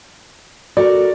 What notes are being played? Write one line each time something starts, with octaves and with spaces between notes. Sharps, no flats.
F#4 A4 A#4 D5